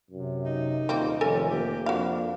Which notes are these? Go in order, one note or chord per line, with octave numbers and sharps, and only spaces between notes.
F#2 C3
D#4
D#1 A#3 C4
F1 D#3 C#4 A4 A#4 G#5
A#3 G4
F2 D4 F#4 F5